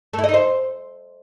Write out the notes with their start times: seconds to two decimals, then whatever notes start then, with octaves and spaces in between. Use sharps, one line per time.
0.13 A3
0.19 E4
0.24 D#5
0.29 D#4
0.34 C5